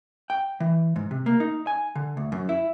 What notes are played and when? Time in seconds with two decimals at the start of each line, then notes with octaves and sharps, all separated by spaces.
0.30 G5
0.60 E3
0.96 G#2
1.11 C3
1.26 A#3
1.40 D#4
1.67 G#5
1.95 D3
2.17 D2
2.32 F#2
2.49 E4